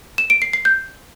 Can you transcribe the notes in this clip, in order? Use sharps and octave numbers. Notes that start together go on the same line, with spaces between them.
E7
D7
C7
C7
G6